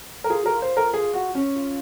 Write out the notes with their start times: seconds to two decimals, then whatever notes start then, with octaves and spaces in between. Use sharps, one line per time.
0.24 A#4
0.30 F4 G#4
0.43 F#4 A#4
0.55 F4
0.62 C5
0.77 A#4
0.94 G#4
1.14 F#4
1.35 C#4
1.56 F4